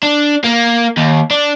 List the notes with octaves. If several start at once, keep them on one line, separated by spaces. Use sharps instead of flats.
D4
A#3
D#2
D4